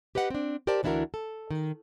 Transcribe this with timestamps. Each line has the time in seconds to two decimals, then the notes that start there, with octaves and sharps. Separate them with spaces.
0.15 G4 B4 D#5 F#5
0.30 C4 D4
0.67 G4 A#4 C5 D5 A5
0.83 D2 E3 D4 E4 F#4 A#4
1.14 A4
1.51 D#3